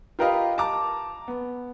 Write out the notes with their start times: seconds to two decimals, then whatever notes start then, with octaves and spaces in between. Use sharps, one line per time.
0.19 F4 G4 A#4 B4 D#5 F5
0.58 A5 A#5 D6
1.28 B3